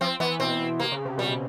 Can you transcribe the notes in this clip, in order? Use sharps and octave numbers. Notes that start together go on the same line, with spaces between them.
F3 C4
E3 B3
B2 C4
C3 A#3
C#3
C3
B2 G3